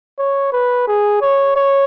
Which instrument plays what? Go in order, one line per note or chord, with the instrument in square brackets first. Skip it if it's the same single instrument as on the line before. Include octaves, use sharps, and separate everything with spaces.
[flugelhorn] C#5
B4
G#4
C#5
C#5